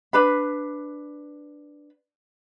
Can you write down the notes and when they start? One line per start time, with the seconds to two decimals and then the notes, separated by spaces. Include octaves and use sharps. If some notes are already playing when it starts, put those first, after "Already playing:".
0.13 D4 B4 B5